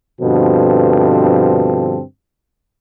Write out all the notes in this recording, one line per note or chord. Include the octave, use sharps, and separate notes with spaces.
G2 B2 D3 F3 C4 A4